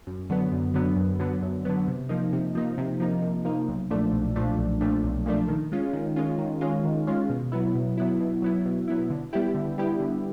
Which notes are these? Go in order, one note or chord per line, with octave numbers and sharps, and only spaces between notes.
F#2
D3 F#3 B3
F#2
D3 F#3 B3
F#2
D3 F#3 B3
F#2
D3 F#3 B3
C3
F3 A#3 D#4
C3
F3 A#3 D#4
C3
F3 A#3 D#4
C3
F3 A#3 D#4
B1
A#2 F3 A3 D4
B1
A#2 F3 A3 D4
B1
A#2 F3 A3 D4
B1
A#2 F3 A3 D4
D#3
G#3 C#4 F4
D#3
G#3 C#4 F4
D#3
G#3 C#4 F4
D#3
G#3 C#4 F4
B2
F#3 B3 E4
B2
F#3 B3 E4
B2
F#3 B3 E4
B2
F#3 B3 E4
D3
G3 B3 E4 G4
D3
G3 B3 E4 G4
D3